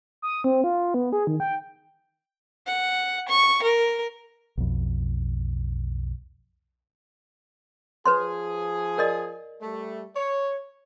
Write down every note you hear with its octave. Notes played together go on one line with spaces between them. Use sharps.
D#6
C4
F4
B3
G#4
D#3
G5
F#5
C#6
A#4
B1 F2
F3 G#4 B4 C#5 C6
A#4 D5 D#5
G3 A3
C#5